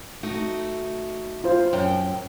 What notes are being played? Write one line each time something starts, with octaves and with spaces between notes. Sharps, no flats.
A3 D#4 F#4
F4 C5
F#2 G5